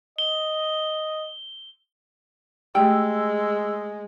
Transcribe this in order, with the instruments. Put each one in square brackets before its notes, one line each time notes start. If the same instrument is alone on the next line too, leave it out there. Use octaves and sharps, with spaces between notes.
[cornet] D#5 [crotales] G7
[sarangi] G#3 [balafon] A3 G4 [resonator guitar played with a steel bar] G5 [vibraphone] E6